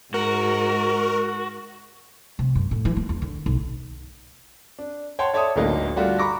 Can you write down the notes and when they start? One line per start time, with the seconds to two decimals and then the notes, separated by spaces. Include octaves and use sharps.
0.14 G#2 F#4 A#4
2.39 C3
2.55 F#2
2.71 A2
2.85 E3
2.96 A#3
3.09 E2
3.22 D3
3.46 B1
4.79 D4
5.19 C#5 F#5 G5 A5 C6
5.34 A4 C#5 D5 E5 A5 D#6
5.56 D1 G1 D3 A3 A#3 D#4
5.96 G3 A3 D4 F4 F#4
6.19 A#5 B5 C#6 D6 A#6